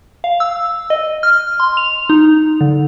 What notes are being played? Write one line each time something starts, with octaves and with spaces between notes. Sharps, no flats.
F5
E6
D#5
F6
C6
F7
D#4
D3